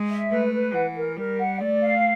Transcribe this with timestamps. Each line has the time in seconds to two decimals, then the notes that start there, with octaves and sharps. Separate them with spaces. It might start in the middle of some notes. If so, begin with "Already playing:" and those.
Already playing: G#3
0.10 E5
0.31 A3 B4
0.53 B4
0.74 E3 F#5
0.96 A#4
1.17 G3 A#4
1.39 F#5
1.60 A3 D5
1.82 F5